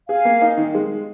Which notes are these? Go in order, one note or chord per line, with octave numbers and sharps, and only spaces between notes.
G#4 F5 G#5
A#3
D#4
D#3
G#3